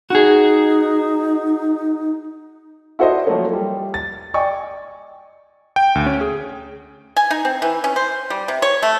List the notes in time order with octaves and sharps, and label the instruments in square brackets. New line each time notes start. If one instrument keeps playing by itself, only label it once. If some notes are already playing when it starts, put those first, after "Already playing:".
[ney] D#4 [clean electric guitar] F#4 G#4
[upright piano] E4 F#4 A4 C5 D5 D#5
F3 F#3 A3 A#3 C#4
G3
A6
D5 D#5 G5 G#5 C#6 D6
[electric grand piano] G5
D2
C#4
G#4
[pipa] G#5
D#4
C4
E3
C#4
C5
G3
C3
C#5
A3